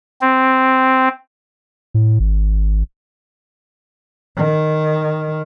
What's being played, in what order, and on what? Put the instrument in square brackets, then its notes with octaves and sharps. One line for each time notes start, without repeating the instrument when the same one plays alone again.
[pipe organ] C4
[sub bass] A2
G#1
[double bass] D#3